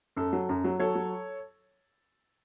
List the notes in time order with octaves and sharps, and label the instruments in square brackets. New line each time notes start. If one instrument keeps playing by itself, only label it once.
[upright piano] F#2 A4
F#3
F#2
F#3
F#3 A4 C#5
F#3